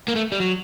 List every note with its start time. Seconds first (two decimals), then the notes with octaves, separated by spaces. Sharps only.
0.08 A#3
0.16 A3
0.32 G3
0.40 F#3